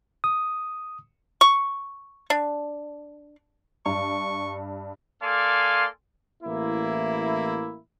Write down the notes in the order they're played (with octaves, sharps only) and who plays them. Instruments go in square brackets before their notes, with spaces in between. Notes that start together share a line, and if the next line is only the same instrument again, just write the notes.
[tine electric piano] D#6
[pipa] C#6
D4
[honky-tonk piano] G2 [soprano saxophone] C#6
[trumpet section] A#3 A4 D5 F5 G#5 C6
[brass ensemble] A1 A#3 E4